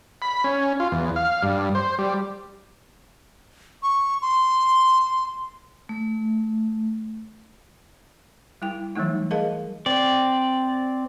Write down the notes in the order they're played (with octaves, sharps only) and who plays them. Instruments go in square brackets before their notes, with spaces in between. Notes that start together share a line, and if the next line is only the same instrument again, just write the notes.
[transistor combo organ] B5
C#4
F4
E2
F5
G2
C5
G3
[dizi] C#6
C6
[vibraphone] A3
[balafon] G3 E4 G5
E3 F#3 G3 A3 D#4
G#4 A#4 D#5 F5 A5
[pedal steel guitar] C4 D5